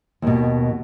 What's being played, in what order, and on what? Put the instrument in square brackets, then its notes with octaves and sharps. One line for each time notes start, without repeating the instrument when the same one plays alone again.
[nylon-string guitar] D#2 B2